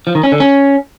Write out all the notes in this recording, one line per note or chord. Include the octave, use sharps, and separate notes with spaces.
F3
D#3
C#4
D3
C#4